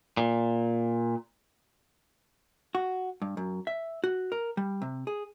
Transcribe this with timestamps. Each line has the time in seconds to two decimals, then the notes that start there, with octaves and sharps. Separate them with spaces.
0.17 A#2
2.75 F#4
3.22 G2
3.37 F#2
3.67 E5
4.04 F#4
4.32 A#4
4.57 G3
4.82 C3
5.07 G#4